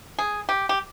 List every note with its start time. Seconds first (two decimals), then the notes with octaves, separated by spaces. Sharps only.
0.19 G#4
0.49 G4
0.69 G4